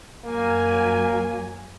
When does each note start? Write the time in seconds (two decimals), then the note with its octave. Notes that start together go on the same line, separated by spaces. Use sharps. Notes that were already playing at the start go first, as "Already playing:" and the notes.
0.25 F#2 F#3 A#3 G#5